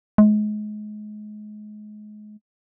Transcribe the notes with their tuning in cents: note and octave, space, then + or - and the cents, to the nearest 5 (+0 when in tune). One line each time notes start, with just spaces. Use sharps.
G#3 +30